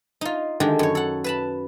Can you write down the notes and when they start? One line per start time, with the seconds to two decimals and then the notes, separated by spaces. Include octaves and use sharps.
0.21 D#4 F4
0.60 D3 D#3 G#3 D4 G4
0.79 F#2 C#5
0.95 A4 F#5
1.24 B4 A5 B5